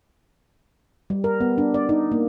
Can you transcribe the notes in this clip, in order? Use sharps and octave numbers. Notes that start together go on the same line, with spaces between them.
G3
A#4
B3
D4
D5
D#4
A#3